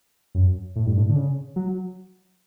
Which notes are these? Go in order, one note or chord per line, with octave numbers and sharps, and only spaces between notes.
F#2
A2
G2
A2
D3
C#3
F#3